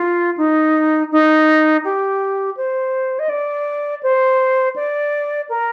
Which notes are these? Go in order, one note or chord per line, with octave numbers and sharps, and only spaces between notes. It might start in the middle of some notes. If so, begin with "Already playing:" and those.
Already playing: F4
D#4
D#4
G4
C5
D#5
D5
C5
D5
A#4